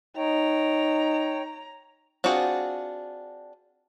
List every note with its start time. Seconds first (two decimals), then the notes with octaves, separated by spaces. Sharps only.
0.17 D#4 C#5 G5 A#5
2.24 C4 D4 F4 F#4 G#4